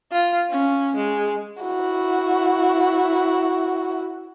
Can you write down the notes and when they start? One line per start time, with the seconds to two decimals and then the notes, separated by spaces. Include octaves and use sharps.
0.12 F4
0.50 C#4
0.96 G#3
1.62 E4 F#4